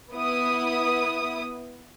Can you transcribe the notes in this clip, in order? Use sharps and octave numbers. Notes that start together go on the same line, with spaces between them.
B3 E4 D#6